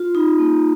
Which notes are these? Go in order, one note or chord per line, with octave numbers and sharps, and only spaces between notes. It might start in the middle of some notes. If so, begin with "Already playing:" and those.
Already playing: F4
D#4
A#3